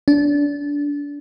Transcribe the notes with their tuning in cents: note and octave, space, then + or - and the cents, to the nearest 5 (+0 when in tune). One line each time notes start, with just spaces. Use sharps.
D4 -25